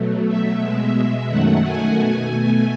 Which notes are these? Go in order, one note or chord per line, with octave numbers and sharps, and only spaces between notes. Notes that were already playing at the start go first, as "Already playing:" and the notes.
Already playing: B2 F#3 A3
E5
B2 G#3
F#2 D#3 F#3 A3 F#5
G#5
B2 A3 G#5
G#5